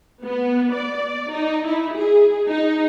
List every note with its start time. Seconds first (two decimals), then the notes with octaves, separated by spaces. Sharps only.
0.23 B3
0.73 D5
1.30 D#4
1.65 E4
1.96 G#4
2.47 D#4